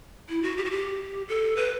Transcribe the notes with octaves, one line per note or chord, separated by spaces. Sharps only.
E4
F#4
G4
F#4
G4
A4
B4